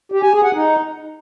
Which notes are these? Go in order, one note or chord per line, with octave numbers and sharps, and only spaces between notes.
G4
G#5
G#4
F#5
D#4